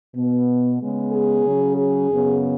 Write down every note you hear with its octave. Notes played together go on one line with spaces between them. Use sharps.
B2 B3
C#3 G#3 B3
G#4
C#3 F#3 C#4
G#4
F#2 C#3 B3